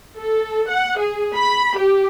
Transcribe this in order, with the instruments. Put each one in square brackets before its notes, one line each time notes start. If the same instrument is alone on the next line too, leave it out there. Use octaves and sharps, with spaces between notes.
[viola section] A4
F#5
G#4
B5
G4